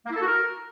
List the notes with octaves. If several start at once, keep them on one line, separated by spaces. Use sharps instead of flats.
A#3
E4
A4
F#4
A#4